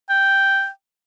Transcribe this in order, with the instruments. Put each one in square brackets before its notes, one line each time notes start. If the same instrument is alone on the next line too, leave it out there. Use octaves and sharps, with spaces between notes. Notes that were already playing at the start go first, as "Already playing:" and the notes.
[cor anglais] G5